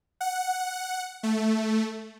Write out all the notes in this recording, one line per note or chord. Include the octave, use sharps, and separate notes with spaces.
F#5
A3